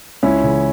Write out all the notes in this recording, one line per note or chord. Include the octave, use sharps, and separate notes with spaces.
C#2 C#4 E4
C#3 E3